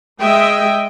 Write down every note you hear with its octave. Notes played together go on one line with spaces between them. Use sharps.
G#3 D#5 E5 G5